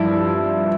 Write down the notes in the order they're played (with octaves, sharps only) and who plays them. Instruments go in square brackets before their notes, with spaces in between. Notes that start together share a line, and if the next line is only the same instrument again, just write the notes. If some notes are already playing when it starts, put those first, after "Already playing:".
Already playing: [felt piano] G2 F3 E4